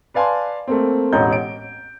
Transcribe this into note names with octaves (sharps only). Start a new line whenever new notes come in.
B4 D5 F5 G#5 A5 C6
A3 A#3 C4
E1 A1 D#5 A#5 G6
D7